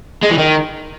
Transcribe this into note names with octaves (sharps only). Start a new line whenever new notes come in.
G#3
E3
D#3